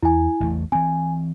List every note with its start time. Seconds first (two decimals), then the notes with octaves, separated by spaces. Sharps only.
0.03 E2 E4 G#5
0.40 A1 E2 A3
0.72 E3 C4 G#5